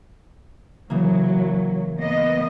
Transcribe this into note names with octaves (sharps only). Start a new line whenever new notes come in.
C#3 E3 F#3 A#3
A#3 B3 D#5